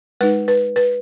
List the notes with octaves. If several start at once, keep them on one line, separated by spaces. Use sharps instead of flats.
G#3 D#4 B4
B4
B4